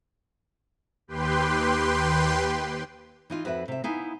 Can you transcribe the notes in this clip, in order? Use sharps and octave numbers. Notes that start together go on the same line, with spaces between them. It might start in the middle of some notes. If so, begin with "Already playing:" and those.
D#2 G4 B4 G5 C6
E3 D#4 F4
F2 F#4 B4 E5
C3 E5
B3 D#4 E4 F5 G#5